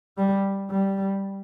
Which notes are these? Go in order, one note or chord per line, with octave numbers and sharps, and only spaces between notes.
G3
G3